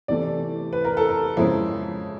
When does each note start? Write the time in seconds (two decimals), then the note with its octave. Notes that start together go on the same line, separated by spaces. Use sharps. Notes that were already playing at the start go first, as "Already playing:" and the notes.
0.08 C3 E3 A3 D5
0.73 B4
0.85 A#4
0.97 A4
1.09 A#4
1.37 F2 C#3 F3 G#3 E4